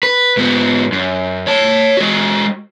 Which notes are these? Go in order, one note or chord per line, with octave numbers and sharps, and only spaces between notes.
B4
G#2 B3
F#2
C#5 A5
G#3 F#4